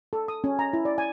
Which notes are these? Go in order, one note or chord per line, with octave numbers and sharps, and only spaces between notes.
A4
D#6
C#4
A#5
E4
D5
G#5